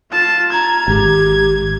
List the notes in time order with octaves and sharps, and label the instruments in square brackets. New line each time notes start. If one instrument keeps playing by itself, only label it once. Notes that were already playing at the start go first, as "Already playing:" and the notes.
[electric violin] F4 A5
[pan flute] A#5 [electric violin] G#6
[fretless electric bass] G#1 [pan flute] G4